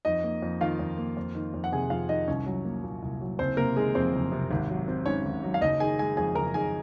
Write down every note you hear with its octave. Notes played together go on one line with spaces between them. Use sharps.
F2 D#4 D#5
A#3
F2
D#3 F4 F5
F2
A#3
F2
D#3
F2
F#5
C3 G#4 G#5
F2 F4 F5
D#3 D#4 D#5
C2 C#4 C#5
F#3
A#3
A#2
C2
F#3
F#1 C4 C5
C3 A#3 A#4
D#3 G#3 G#4
F2 C4 C5
F#1
C3
G#1
F#3
C4
G#2 C#4 C#5
G#1
F#3
F5
F#1 D#4 D#5
D#3 G#4 G#5
G#3 G#4 G#5
F2 G#4 G#5
F#1 A#4 A#5
D#3 G#4 G#5